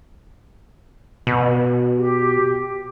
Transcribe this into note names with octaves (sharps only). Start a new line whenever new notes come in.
B2
G4